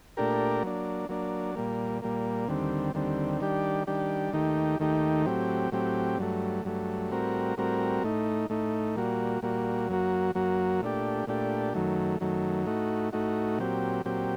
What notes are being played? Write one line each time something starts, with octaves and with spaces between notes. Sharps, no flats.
A#2 A3 D4 G4 A#4
F#3 A#3 D4
F#3 A#3 D4
A#2 G3 A#3
A#2 G3 A#3
D#2 D3 G3 C4
D#2 D3 G3 C4
D#3 G3 D4 G4
D#3 G3 D4 G4
D#2 D#3 A3 D#4 G4
D#2 D#3 A3 D#4 G4
A2 F#3 C4 G4
A2 F#3 C4 G4
G2 F#3 A3
G2 F#3 A3
A2 G3 C4 F#4 A#4
A2 G3 C4 F#4 A#4
A2 A3 D#4
A2 A3 D#4
A#2 G3 A#3 F#4
A#2 G3 A#3 F#4
F#2 F#3 A#3 F#4
F#2 F#3 A#3 F#4
A#2 A3 D4 G4
A#2 A3 D4 G4
F#2 D#3 F#3 A3
F#2 D#3 F#3 A3
A2 A3 D#4 F#4
A2 A3 D#4 F#4
A#2 F#3 C4 G4
A#2 F#3 C4 G4